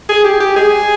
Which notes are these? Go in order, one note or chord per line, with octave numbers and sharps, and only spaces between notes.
G#4
G4
G4
G#4